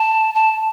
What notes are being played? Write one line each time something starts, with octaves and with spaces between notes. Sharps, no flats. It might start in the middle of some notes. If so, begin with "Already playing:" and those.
Already playing: A5
A5